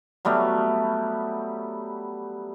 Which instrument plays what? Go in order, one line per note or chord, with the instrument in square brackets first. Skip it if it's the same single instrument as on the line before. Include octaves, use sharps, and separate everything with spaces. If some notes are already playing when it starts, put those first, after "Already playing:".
[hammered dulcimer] F#3 G3 A3 B3